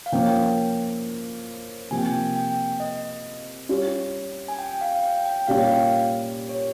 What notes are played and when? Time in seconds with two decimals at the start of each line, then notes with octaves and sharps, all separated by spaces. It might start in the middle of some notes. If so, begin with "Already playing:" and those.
0.06 F5
0.12 F3 A#3 C#4 G5
1.91 C3 F3 A#3 G#5
1.98 G5
2.06 G#5
2.36 G5
2.80 D#5
3.69 G3 C#4 F4
4.48 G#5
4.59 G5
4.81 F5
5.03 G5
5.26 G5
5.47 A#2 G3 C#4 G4 F5
5.58 G5
5.67 F5
6.49 C#5